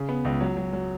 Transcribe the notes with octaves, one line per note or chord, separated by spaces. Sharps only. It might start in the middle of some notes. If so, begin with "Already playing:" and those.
Already playing: C#3
B3
C#2
F#3
F#3
F#3